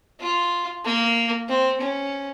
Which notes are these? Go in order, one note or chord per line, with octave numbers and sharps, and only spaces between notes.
F4
A#3
C4
C#4